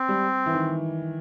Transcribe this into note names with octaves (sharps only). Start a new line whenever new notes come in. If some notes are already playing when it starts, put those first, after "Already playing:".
Already playing: C4
G3
E3
D#3